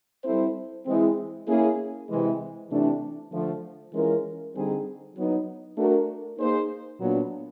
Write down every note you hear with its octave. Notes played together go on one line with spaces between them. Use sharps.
G3 C4 E4 A4 C5
E3 G#3 C4
A#3 C#4 E4 G#4
C3 E3 G#3
C3 E3 A3 D4
D3 F3 A3
E3 G#3 C#4 F4 A#4
D3 G3 C4 D#4 G#4
F#3 B3 D#4
A3 D4 F#4 A#4
A#3 D#4 G#4 C5
A#2 F#3 B3 D4